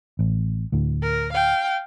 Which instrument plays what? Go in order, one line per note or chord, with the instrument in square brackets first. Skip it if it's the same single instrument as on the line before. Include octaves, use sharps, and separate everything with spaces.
[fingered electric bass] A1
D2 A2
[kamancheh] A#4
F5 G5